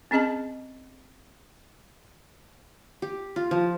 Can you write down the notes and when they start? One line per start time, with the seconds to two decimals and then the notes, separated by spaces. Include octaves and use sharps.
0.11 C4 C#4 G#4 D#5 A5
3.02 G4
3.36 F4
3.51 F3